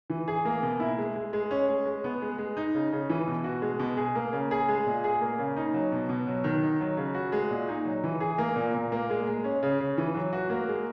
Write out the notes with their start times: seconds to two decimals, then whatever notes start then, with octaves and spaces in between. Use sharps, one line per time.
0.10 E3
0.28 G#4
0.45 A#3
0.62 B2
0.80 E4
0.98 G#3
1.15 G#3
1.33 G#3
1.51 C#4
1.68 G#3
1.86 G#3
2.04 B3
2.22 G#3
2.38 G#3
2.57 D#4
2.74 C#3
2.92 C#3
3.10 E3
3.27 B2
3.44 F#4
3.62 G#3
3.79 B2
3.97 G#4
4.15 A#3
4.33 C#3
4.51 G#4
4.68 G#3
4.86 A#2
5.04 G#4
5.21 A#3
5.38 C#3
5.56 D#4
5.74 F#3
5.92 B2
6.09 B2
6.27 F#3
6.44 D#3
6.62 D#4
6.81 F#3
6.97 C#3
7.15 F#4
7.32 G#3
7.50 A#2
7.69 D#4
7.85 F#3
8.04 E3
8.20 G#4
8.38 A#3
8.56 A#2
8.74 A#2
8.92 A#3
9.10 G#3
9.27 G#3
9.44 C#4
9.63 C#3
9.80 C#3
9.98 E3
10.14 F#3
10.33 F#4
10.50 A#3
10.69 G#3